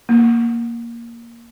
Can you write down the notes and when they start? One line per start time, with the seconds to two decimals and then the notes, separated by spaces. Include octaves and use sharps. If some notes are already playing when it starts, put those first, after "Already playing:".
0.09 A#3